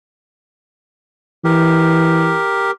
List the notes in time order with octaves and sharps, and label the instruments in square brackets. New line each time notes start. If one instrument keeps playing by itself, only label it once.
[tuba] E3 [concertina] G4 A#4